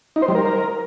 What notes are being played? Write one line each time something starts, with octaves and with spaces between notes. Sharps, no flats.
D#4
C5
G3
A#4